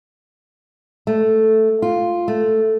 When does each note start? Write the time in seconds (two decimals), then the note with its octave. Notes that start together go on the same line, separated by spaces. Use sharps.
1.07 A3
1.82 F4
2.28 A3